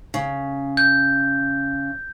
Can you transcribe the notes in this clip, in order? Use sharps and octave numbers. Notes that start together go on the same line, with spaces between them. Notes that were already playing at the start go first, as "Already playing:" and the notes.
C#3
G6